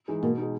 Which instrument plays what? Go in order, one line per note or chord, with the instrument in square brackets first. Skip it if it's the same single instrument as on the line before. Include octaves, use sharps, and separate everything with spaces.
[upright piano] E3 G#3 D#4
[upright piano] B2 [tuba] A#3
[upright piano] G#3 D#4